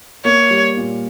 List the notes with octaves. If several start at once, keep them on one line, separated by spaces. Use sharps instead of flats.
A#3 C#5
G3
A#2